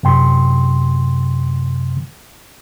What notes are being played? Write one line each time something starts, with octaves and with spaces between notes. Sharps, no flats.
F#2 C3 G5 C6